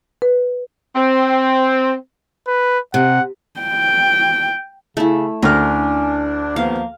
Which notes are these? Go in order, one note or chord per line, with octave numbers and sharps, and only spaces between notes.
B4
C4
B4
C3 F#5
G5
C#3 A3 E4
D2 C#4 D4 A#4 F6
D#2 F3 A#3 B3 F5